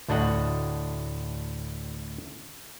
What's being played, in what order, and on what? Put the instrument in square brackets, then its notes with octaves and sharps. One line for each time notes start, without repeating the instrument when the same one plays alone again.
[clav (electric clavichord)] D2 A2 D4 F#4 D#5 F#5